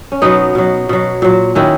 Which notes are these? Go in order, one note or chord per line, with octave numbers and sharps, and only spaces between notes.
C#4
B2 F#3 B3 D#4
B2 F#3
B2 F#3
A#2 F#3
D#3 F#3 C#4 E4